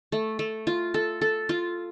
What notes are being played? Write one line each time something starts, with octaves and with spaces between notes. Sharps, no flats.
A3
A3
F4
A4
A4
F4